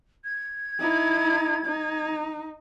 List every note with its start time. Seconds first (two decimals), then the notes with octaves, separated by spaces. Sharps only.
0.24 G#6
0.80 D#4 E4
1.66 D#4